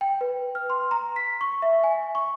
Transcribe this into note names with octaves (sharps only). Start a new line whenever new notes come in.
G5
B4
F6
C6
A#5
B6
C#6
E5
G#5
C#6